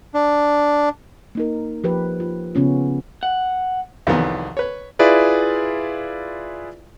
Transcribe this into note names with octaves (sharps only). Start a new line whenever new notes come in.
D4
A#3 D#4 A#4
F3 G4 B4
F4
C#3 B3 C#4 F4
F#5
C2 F2 D#3 E3 F#3 B3
B4 C#5
E4 F4 G#4 B4 D5 E5